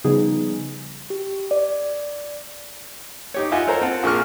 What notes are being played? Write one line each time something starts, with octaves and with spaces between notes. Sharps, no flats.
C#3 F3 G3 B3 D#4 G#4
G4
D5
D#4 G4 C#5
F4 D#5 E5 F#5 G#5
A4 A#4 C5 C#5 A#5
C4 F4 F#5 A5
A#1 A#2 A#3 G#4 C#6 F6